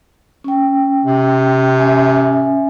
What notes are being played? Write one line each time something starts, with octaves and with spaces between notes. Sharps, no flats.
C#4 G5
C3
C#4 E5 G#5